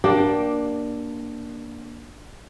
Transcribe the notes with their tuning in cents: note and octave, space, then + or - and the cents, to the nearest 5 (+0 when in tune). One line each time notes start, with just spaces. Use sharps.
A#3 +20 D4 +0 G4 -5